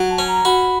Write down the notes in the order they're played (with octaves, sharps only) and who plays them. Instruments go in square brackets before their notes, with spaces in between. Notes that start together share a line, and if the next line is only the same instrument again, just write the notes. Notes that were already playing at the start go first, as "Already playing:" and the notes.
Already playing: [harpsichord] F#3
[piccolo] A5
[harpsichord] C#4
[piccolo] A#5
[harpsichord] F#4 [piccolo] B5